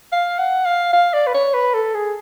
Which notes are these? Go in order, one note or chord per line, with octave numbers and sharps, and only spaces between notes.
F5
F#5
F5
F5
D5
B4
C#5
B4
A4
G#4